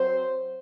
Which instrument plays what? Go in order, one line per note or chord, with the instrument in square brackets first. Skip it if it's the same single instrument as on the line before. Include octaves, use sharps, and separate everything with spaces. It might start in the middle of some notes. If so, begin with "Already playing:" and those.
Already playing: [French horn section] F#3 C4 C5